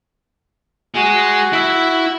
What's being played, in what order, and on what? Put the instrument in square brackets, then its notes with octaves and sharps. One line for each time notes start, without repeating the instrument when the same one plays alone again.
[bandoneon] F#4 [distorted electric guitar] G#4 D#5
[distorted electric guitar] E4 E5